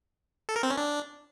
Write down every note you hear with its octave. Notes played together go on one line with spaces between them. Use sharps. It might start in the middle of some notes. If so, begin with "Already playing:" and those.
A4
A#4
C4
C#4
D4